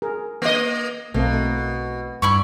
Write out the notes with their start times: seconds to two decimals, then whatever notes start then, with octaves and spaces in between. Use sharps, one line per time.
0.02 G#4 A#4
0.42 A#3 D#5
1.14 B1 B2 A3 A#3 C4
2.22 G2 E4 D5 C#6